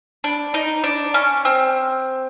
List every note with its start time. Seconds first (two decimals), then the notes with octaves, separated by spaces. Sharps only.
0.24 D4
0.54 D#4
0.84 D4
1.14 C#4
1.45 C4